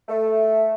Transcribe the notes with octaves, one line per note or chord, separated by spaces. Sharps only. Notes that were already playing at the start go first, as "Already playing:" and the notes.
A3